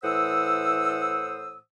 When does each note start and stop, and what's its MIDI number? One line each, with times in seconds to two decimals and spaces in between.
0.03 1.58 45
0.03 1.58 52
0.03 1.58 72
0.03 1.58 78
0.03 1.58 87
0.03 1.58 88